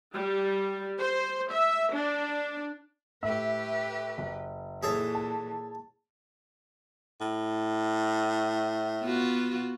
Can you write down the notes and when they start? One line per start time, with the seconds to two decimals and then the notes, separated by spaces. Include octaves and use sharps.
0.13 G3
0.99 C5
1.52 E5
1.93 D4
3.23 A2 G4 B4 E5
4.18 F#1
4.83 A#2 E3 G#4 A4 C#5
5.15 A5
7.21 A2
9.03 B3 F4 F#4